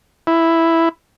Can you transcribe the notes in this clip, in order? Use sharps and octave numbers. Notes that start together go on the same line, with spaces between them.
E4